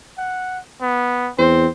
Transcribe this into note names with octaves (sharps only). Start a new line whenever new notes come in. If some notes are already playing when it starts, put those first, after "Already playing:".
F#5
B3
E2 C4 C5